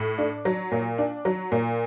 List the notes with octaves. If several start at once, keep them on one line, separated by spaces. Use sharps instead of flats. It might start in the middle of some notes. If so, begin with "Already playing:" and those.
Already playing: A2
D4
F#3
A#2
D4
F#3
A#2